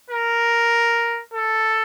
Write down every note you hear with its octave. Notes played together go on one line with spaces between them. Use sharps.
A#4
A4